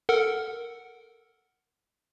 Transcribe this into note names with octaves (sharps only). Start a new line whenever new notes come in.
A4 A#4 F#5